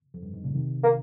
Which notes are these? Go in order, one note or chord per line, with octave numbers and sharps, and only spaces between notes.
F2
G2
G#2
A#2 C#3
C3 D#3
A#3